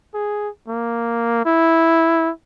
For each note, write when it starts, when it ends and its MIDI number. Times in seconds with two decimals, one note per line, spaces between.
0.14 0.49 68
0.68 1.45 58
1.45 2.30 64